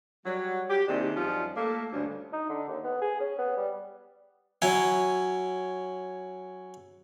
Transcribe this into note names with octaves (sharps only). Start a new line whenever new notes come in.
F#3 G3
G4
D#2 C3 D#3 D4 E4 G#4
F#2 F3 G3 C#4 D#4 F4
A3 A#3 A4
D2 G2 C#4
D#4
D3
D#2
B3
G#4
C#4
B3
G3
F#3 C#4 E4